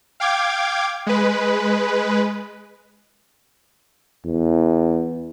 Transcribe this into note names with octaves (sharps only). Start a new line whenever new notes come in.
F5 G5 D6 G#6
G#3 B4
E2